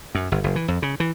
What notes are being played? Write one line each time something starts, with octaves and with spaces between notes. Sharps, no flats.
F#2
G1
F#1
E3
F2
C#3
E3